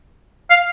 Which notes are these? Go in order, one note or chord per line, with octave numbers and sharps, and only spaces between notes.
F5